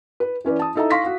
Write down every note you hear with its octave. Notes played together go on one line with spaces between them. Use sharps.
B4
E3 C#4 B4 D5
A5 D#6
D#4 E4 A4 D#5 E5 A#5
F5 C6 C#6 A#6 B6
F#4 F5